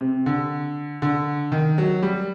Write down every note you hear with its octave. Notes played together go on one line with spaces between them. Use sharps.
C3
D3
D3
D#3
F#3
G3